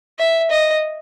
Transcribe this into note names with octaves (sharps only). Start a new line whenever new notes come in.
E5
D#5